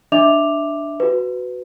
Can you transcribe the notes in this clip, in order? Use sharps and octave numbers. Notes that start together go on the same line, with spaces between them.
D4 D#5 E5 D6 F7
F#4 B4